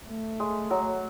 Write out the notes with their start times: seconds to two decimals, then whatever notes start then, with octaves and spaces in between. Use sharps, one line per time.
0.08 A3
0.40 G#3
0.71 F#3